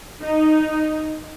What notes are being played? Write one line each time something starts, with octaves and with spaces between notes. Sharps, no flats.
D#4